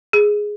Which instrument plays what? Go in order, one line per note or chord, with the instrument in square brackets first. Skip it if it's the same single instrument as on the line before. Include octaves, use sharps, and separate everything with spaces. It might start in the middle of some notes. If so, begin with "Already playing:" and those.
[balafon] G#4